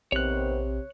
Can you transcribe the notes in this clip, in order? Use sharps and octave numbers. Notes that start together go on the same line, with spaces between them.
A#1 C3 D#3 B3 C4 C#5 F#6